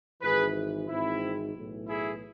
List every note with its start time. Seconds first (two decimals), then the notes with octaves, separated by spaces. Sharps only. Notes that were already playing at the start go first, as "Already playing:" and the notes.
0.22 G#1 G#2 E3 G#4 B4
0.88 G#1 G#2 E3 C4 E4
1.55 B1 A2 E3
1.88 E4 G#4